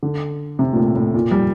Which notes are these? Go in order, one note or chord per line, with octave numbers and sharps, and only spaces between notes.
D3
C3
A#2
A2
A2
A#2
G3